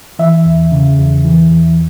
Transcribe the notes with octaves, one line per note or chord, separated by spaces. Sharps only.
E3 E5
E2
C#3
E2
E3
E2